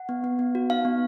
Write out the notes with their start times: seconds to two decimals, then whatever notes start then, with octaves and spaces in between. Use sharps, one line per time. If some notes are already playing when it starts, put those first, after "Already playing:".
Already playing: F#5
0.09 B3
0.24 B3
0.39 B3
0.55 F#4
0.70 D#4 F5
0.85 B3